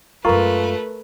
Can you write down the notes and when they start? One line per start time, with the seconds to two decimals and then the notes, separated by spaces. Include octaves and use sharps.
0.25 F#2 G#3 A3 F4 A#4 B4 A#5 C#6